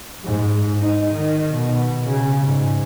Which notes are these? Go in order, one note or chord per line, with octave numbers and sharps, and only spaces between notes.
G#2
D#4
D#3
B2
C#3
G#2